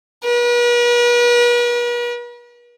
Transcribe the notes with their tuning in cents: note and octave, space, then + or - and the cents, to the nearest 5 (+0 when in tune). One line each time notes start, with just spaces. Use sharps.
B4 -45